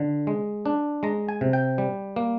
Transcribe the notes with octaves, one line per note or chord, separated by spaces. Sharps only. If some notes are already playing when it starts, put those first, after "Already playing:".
Already playing: D3
G#3
D4
G#3 A#5
G#5
C3
G5
G3
A#3